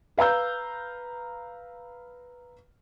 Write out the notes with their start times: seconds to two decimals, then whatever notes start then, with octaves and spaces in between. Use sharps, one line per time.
0.17 B4 F5 A#5 E6 G6